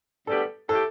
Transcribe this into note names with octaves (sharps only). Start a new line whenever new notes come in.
D2 D3 G3 B3 G4 A4
A2 A3 G4 A4